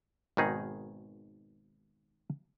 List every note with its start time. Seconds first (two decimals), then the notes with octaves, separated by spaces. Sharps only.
0.37 G#1 B2 D#3 D#4 G#4